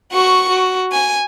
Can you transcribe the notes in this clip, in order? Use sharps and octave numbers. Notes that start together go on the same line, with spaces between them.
F#4 C#6
F#4
G#5